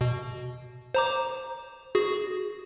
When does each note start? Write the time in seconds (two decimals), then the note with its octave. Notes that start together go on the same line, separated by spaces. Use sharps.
0.01 B2
0.94 C5 A#5 D6
1.95 F#4 G#4